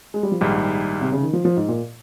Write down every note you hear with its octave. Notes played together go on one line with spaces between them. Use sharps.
G#3
G3
F3
A#1 G#2 D#3 G3
C3
C#3
D#3
F3
F3
G#2
A#2